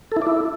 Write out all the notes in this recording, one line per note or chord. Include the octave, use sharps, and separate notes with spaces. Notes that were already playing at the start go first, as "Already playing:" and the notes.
A4
E4
D5
E4